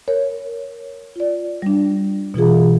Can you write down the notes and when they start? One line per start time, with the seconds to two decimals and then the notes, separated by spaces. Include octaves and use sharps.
0.08 A#4 C#5
1.16 F4 D5
1.62 G3 D4
2.34 B2 E3 F4 G#4